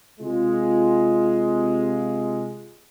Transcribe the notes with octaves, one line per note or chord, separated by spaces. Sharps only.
C3 G#3 F4